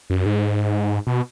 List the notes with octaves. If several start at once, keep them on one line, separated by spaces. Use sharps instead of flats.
F#2
G#2
B2